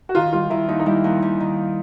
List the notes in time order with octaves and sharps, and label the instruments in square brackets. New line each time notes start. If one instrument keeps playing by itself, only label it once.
[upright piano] F#4
[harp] D#3 [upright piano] F4
[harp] G3 [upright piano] F4
[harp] D#3 [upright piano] E4
[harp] D#2 [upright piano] D#4
[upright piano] D#4
[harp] G3 [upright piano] E4
[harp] D#2
D#2
D#3